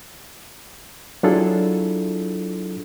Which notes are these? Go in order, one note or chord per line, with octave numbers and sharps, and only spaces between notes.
F#3 D4 E4 F4 G#4 A4